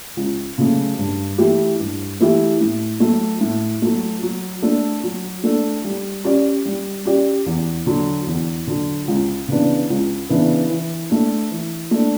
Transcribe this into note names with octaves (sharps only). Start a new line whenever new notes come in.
C#2
C#3 F#3 A3
G2
E3 A3 E4 G4
G2
E3 A3 E4 G4
A2
F#3 A3
A2
F#3 A3
F#3
A3 D4 A4
F#3
A3 D4 A4
G3
C#4 G4 D5
G3
C#4 G4 D5
E2
D3 F#3
E2
D3 F#3
C#2
C#3 E3 B3 D4
C#2
C#3 E3 B3 D4
E3
A3 D4
E3
A3 D4